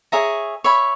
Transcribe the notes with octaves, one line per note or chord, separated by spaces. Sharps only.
G#4 C#5 E5 A#5
C#5 E5 B5